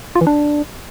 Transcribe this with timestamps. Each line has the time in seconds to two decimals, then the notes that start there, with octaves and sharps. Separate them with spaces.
0.16 F4
0.21 E3
0.27 D4